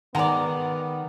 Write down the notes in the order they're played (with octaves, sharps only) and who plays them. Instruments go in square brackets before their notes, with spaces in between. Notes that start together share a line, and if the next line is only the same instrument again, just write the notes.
[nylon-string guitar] D#3 [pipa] G#3 D5 [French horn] B3 [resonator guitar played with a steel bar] F#5 A#5